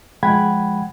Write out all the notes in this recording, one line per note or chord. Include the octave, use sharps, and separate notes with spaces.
F3 G#3 F#5 G5 B5 G#6